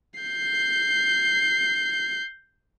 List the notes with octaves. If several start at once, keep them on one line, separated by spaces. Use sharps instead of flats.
G6 C7